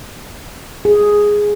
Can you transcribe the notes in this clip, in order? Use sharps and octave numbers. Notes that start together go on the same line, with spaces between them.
G#4